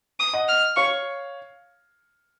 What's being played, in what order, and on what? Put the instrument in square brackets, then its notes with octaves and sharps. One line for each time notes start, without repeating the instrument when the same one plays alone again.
[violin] D#6
[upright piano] D#5 F#5
[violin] F6
[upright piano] C#5 F5 [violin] C#6